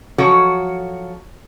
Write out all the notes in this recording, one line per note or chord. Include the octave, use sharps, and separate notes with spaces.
F3 F#3 F#4 A4 C#5